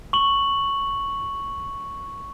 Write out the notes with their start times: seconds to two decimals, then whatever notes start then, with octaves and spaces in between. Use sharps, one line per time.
0.13 C#6 F#7